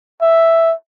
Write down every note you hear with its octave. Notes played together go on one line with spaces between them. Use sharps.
E5